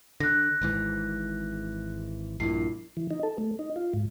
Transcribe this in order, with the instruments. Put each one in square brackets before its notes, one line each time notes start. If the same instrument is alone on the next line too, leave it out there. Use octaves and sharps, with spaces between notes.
[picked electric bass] D3 [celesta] F#6 A#6
[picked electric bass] G#1 G#2 E3
[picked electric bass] A#1 G2 A#2 [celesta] E4 C7
[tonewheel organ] E3
D#4
A4
A3
D#4
F4
G#2